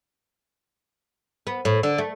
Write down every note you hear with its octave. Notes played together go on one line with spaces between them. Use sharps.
B3
A2
D3
A3